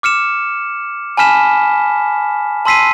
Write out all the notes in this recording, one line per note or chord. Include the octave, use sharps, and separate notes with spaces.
D6 F6 C#7 E7
G#5 A5 B5 F6 B6 E7
A5 C6 E6 B6 C7 D#7